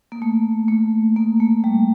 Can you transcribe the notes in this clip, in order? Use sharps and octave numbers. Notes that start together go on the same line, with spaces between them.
A#3
A3
A3
A#3
A3
G3